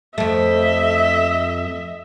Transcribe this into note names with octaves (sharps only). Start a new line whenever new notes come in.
F2 A3 D#5 E5